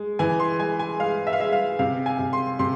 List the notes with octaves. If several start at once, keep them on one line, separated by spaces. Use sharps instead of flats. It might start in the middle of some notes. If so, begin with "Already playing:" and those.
Already playing: G#3
E3 G#5
C6
G#3 G#5
G#5
G#3 F5
E5
F5
G#3 E5
F5
C3 F5
G#5
C3
C6
C3 C6